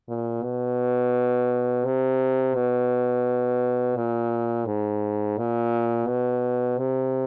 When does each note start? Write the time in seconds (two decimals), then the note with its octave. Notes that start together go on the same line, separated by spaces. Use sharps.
0.08 A#2
0.43 B2
1.85 C3
2.54 B2
3.96 A#2
4.66 G#2
5.38 A#2
6.07 B2
6.78 C3